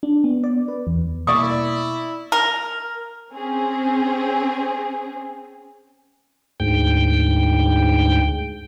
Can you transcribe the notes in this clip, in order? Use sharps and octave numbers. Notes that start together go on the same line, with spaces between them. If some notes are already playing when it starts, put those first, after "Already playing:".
D4
B3
D5
B4
E2
B2 A#3 E4 D5 C#6 D#6
A#4
C4 C#4 G#4
D2 G#2 G5